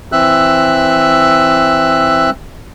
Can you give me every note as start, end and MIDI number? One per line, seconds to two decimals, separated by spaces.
0.12 2.30 52
0.12 2.30 60
0.12 2.30 76
0.12 2.30 88
0.12 2.30 90